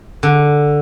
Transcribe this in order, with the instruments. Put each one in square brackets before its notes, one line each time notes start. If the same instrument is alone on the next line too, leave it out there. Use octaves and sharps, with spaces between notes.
[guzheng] D3